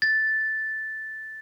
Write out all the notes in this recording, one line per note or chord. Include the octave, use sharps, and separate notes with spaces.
A6